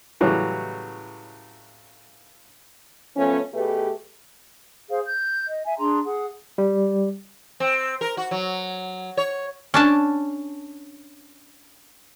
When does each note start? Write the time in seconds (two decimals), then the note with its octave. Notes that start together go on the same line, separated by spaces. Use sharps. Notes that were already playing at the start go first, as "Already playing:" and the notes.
0.21 A2 C#3 E3 F#3 G3
3.16 F3 A3 B3 C#4
3.54 B2 A3 G4 G#4 B4
4.90 G#4 C5 F5
5.06 G6
5.47 D#5
5.65 E5 G#5
5.78 D4 G#4 A#5 C6
6.05 G#4 F#5
6.58 G3
7.60 C4
8.01 A#4
8.17 F#4
8.31 F#3
9.17 C#5
9.74 C#4 D4 A5